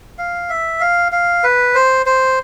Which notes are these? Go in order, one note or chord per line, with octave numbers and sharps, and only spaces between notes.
F5
E5
F5
F5
B4
C5
C5